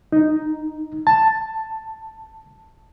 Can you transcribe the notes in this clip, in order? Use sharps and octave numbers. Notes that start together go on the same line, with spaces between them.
D#4
A5